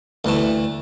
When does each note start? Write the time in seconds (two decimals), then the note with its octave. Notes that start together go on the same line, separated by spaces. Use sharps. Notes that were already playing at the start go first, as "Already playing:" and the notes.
0.25 D2 E3 A3